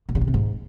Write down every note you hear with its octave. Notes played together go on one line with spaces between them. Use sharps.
A#2
C#3
B2
C3
G#2